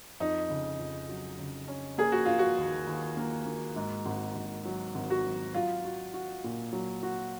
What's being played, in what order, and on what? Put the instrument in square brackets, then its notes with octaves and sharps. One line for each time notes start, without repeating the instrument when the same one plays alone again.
[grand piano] F2 [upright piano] D#4
[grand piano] C#3
F2
F#3
C#3
C#4
[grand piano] A#3 [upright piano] G#4
[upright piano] F#4
[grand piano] A#3 [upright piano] F4
[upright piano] F#4
[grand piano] D#2
D#2
A#3
A#3
G#2
G#1
G#1
F#3
G#1
[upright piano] F#4
[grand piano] F#3
[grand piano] F#3 [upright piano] F4
[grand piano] F#4
F#4
A#2
F#3
F#4